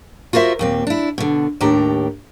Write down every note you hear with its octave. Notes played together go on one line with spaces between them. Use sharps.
F4 F#4 A#4 C5 E5
D#2 A#2 C4
D4 E4
B2 D3
D#2 A2 D4 G4 A#5